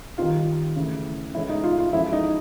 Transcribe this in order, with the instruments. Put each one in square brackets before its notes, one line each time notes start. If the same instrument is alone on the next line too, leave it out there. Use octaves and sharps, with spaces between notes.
[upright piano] D#3 G3 C4 D#4 F4
C#3 E3 A3
C#3 E3 G#3 C#4 E4
D#4
F4
F4
F3 G#3 C#4 E4
D#4